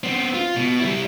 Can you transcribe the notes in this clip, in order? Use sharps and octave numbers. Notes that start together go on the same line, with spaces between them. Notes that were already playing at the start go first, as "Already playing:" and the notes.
B3 C4
F4
B2
G3 E4